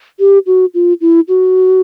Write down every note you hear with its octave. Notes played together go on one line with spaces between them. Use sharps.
G4
F#4
F4
E4
F#4